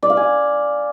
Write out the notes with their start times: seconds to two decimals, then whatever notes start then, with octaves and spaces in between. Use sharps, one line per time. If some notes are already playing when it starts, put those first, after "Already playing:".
0.03 D5
0.10 F5
0.17 G#5